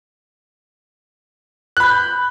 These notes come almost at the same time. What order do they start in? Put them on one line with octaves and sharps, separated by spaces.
F#6 B5 G6